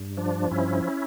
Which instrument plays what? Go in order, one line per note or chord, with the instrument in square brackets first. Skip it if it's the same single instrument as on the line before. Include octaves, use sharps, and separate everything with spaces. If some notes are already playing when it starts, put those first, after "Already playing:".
Already playing: [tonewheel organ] G2
F3 D4
G2 C#4 E4